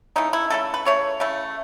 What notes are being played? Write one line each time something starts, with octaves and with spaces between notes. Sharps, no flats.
C#3 E3 A3 D#4
E4
C#3 E3 A3 A4
B4
C#3 E3 A3 C#5
C#3 E3 A3